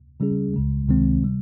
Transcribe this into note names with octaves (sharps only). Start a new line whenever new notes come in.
C#3 G3 C#4 G#4
C#2 C#3 G#3
C#2 C3 D#3 G#3 C4
C3 G3